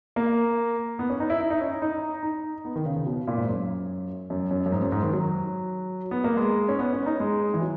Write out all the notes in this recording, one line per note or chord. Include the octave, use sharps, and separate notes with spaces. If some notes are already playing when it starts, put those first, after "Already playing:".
A#3
B3
C#4
D#4
E4
E4
D#4
C#4
D#4
D#4
B3
D#3
C#3
C#3
B2
A#2
G#2
F#2
F#2
F#2
F#2
G#2
F#2
G#2
D#3
F#3
B3
A#3
G#3
C#4
B3
C#4
D#4
G#3
E3
F#3